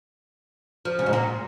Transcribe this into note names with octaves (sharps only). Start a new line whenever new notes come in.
F3
C#3
G#2
A#2